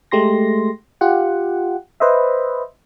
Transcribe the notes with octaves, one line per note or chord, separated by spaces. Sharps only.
G#3 A3 G4 C6 A#6
F4 G4 F#5
B4 C5 D#5 E5